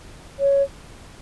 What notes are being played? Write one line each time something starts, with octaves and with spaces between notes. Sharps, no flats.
C#5